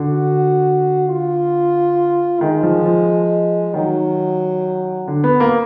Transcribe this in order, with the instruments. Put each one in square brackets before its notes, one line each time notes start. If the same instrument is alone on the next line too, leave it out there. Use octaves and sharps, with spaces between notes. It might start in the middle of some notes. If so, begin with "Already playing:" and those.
Already playing: [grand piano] D3 [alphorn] F#4
[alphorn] F4
[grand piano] D#3 [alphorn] G#3
[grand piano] F3
F3
[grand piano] D#3 [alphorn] F#3
[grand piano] D3
B3
A#3